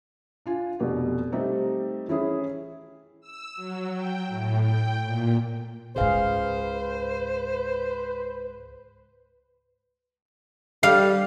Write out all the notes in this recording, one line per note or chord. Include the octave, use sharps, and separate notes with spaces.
D4 F4 G#5
F1 B2 G4
G3 A3 C4 D#4 G4
E3 C#4 E4 G#4
E6
F#3
G5
A2
G5
A#2
C#2 G#2 G#4 B4 C5 F5
G3 F5